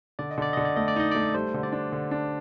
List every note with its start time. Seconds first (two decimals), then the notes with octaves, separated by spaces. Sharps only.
0.19 D3 D5
0.31 D#5
0.38 D3 D5
0.53 D3 D#5
0.65 D5
0.76 A3 D#5
0.88 D5
0.96 D#4 D#5
1.11 A3 D5
1.34 G3 C5
1.54 D3
1.63 D5
1.72 D4
1.92 D3
2.11 D4